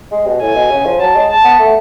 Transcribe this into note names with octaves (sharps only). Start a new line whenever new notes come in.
G#3
B2
A2 G#5
B2
C#3
F3
F#3 A5
G#3
A5
B3
A3